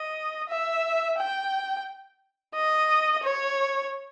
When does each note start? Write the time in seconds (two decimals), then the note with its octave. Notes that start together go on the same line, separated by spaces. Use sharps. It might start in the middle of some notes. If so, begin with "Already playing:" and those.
Already playing: D#5
0.49 E5
1.18 G5
2.55 D#5
3.23 C#5